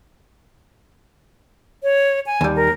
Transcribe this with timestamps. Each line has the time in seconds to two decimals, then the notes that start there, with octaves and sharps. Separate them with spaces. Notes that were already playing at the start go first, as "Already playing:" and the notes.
1.83 C#5
2.26 G#5
2.41 D#2 G3
2.56 A#4